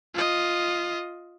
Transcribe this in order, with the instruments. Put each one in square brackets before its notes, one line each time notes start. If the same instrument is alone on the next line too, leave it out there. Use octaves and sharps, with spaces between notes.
[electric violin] F4 D#5